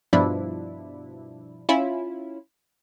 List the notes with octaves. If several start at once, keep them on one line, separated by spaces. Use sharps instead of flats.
G2 B2 F3 D4 E4
C#4 E4 F4